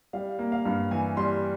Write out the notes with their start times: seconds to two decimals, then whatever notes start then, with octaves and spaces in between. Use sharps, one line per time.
0.13 G3 F5
0.39 A#3
0.52 F5
0.65 G2
0.91 E3 G#5
1.17 G3 C6